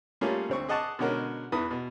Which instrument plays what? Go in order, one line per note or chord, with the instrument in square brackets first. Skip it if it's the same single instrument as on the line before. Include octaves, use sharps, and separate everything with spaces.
[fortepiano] G3 A3 A#3 C#4 F4 G#4
D2 C4 C#6
G#4 D#5 F#5 A5 C#6 D6
B2 D3 G#3 C#4 F#4 A#4
E2 E3 B4 D#6
B2